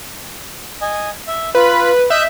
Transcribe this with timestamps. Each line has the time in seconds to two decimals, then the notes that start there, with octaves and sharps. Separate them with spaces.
0.81 D#5 G#5
1.27 E5
1.55 F4 B4 B5
2.10 D#5 E5 F#6 G6